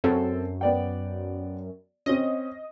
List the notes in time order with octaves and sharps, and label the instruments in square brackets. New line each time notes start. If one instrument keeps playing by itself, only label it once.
[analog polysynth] F#2 [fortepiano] C4 A4
[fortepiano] B3 D5 G5
[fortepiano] C4 C#4 [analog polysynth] D#5